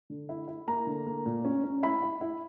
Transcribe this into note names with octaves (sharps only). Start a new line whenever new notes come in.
D3
E4
E4
A#3 A#5
D3
A#3
A#2
C#4
C#4
E4 B5
E4
E4